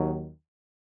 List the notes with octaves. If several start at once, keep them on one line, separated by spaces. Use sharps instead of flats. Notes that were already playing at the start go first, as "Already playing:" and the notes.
Already playing: D#2 D#3 F#3